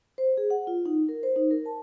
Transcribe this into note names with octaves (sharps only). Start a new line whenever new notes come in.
C5
G#4
F#5
F4
D#4
A#4
C5
D#4
A#4
A5